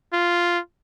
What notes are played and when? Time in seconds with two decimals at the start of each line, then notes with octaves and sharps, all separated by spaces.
0.13 F4